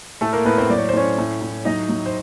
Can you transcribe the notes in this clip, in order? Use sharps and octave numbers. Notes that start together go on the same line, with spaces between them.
A2 A3 A4
A#3 A#4
A2 B3 B4
C4 C5
F#3 D5
C#5
C5
A2 C#4 C#5
A2
A2
F#3 D#4 D#5
F#3
C5